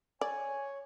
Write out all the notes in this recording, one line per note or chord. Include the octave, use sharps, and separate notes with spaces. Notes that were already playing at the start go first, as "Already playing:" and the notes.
C#5 D5 G#5